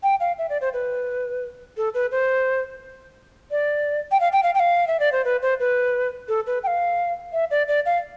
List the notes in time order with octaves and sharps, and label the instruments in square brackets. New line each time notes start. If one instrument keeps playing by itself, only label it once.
[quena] G5
F5
E5
D5
C5
B4
A4
B4
C5
D5
G5
F5
G5
F5
G5
F5
E5
D5
C5
B4
C5
B4
A4
B4
G5
F5
E5
D5
D5
F5